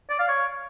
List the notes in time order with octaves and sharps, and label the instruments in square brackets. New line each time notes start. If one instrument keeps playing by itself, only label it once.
[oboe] D5
F5
C#5